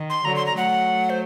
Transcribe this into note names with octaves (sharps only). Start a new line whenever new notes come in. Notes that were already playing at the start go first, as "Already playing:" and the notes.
Already playing: D#3
C6
D3 F#3 A#5
C6
A#5
F#3 A3 F#5
C5